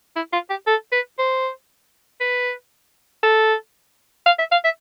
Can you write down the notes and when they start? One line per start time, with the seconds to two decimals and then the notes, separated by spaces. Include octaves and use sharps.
0.16 E4
0.33 F4
0.50 G4
0.67 A4
0.92 B4
1.19 C5
2.20 B4
3.23 A4
4.26 F5
4.39 E5
4.52 F5
4.64 E5